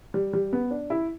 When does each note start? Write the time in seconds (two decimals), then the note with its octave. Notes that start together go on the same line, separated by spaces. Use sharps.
0.14 G3
0.33 G3
0.53 B3
0.71 D4
0.90 E4